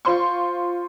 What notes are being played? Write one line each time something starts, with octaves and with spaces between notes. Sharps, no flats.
F4 C5 C6 C#6